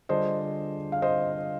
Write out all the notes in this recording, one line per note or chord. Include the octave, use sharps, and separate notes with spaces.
D3 G3 D4 F4 G#4 C5 D#5
F5
C5 D#5